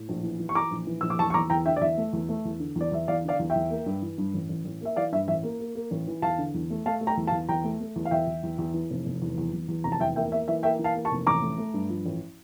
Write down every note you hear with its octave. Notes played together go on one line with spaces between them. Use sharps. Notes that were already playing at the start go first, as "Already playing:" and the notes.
Already playing: A2
A#1
E3
E3
C#6
E3 A#5 D6
A#1
E3
A#1 E6
D6
E2 A5 C#6
C#6
E2 A#5 D6
E2 G5 A#5
D3 E5 G5
D5
E2 E5
A3
E2
A3
E2
D3
E2 D5
E2 E5
E2 D5 F5
D3 D5 F5
E2
E5 G5
E2
A#3
G2
E3
G2
A1
A1
A1
A#3 E5
E3 D5 F5
G2 E5
A1 E5
A#3
A#3
A#3
A1
E3
E2 F5 A5
D3
E2
A3
A3 F5 A5
A3
G5 A#5
E2
F5 A5
E2
E2 G5 A#5
A3
A3
E2
F5
E2 E5 G5
E2
E2
E2
E3
F1
F1
E2
E2
E2
E2
F1 A#5
A5
E2 E5 G5
A#3 E5 G5
A#3 E5
E3 E5
A#3 E5 G5
E3
F5 A5
A#3
A5 C#6
F1
A1 A#5 D6
A3
A3
G2
F3
A1